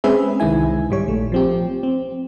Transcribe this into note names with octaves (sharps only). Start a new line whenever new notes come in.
G#3 C4 C#4 G#4 B4 E5
C2 D#3 G#3 E4 G#5
G#2 G3 C#5
A#1 A3
F3 C4 G4
C4